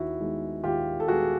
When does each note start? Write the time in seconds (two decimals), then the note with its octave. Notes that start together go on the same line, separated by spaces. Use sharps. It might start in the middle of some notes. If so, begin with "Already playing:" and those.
Already playing: D#2 E4 F#4
0.20 D#3 G#3 B3
0.64 D#2 F4 G4
1.00 A4
1.08 D#3 G#3 B3 F#4 G#4